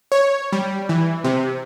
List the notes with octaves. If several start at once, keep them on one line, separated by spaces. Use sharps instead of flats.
C#5
G3
E3
C3